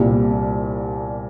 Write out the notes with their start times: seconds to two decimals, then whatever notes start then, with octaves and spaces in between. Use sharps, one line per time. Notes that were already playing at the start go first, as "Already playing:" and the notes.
Already playing: C2 A#2 G3